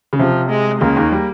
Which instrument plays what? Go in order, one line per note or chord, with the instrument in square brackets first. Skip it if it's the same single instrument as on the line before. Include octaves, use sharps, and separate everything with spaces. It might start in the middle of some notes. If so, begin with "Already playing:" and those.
[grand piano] C#3
[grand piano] C3 [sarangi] F3
[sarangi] G#3
[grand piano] C#2 C#3 [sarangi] A#3
[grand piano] D#2 D#3
G3